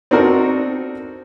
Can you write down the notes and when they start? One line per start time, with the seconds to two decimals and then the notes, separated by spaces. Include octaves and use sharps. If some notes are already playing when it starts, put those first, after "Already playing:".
0.11 C4 D4 D#4 F#4 A4 A#4